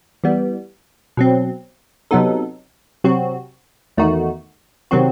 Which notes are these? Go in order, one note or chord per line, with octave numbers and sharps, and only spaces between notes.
E3 G3 B3
B2 F#3 C4
C3 F#3 B3 D#4 A4
C3 F#3 C4 F#4
E2 D#3 A3 D#4 F#4
C3 D#3 F#3 C4 F#4